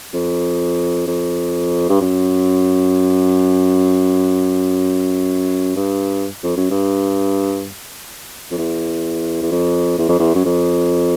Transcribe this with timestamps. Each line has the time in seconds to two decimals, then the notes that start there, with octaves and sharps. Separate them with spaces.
0.14 F2
1.07 F2
1.90 G2
2.01 F#2
5.76 G2
6.43 F2
6.57 F#2
6.71 G2
8.51 F2
8.58 E2
9.42 E2
9.52 F2
9.98 E2
10.09 F2
10.19 E2
10.35 F#2
10.46 F2